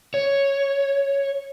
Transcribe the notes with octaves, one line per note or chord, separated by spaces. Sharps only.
C#5